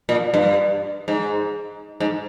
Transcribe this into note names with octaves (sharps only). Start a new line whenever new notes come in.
A#2
G2
G#2
G#2